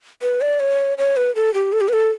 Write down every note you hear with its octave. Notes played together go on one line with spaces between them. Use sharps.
B4
D5
C#5
C#5
B4
A4
G4
A4
G4
B4
A4